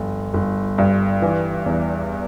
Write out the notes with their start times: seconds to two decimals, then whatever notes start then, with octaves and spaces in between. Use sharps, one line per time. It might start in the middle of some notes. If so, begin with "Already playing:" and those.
Already playing: G1 F3
0.34 G1
0.78 G2
1.22 E3
1.66 E2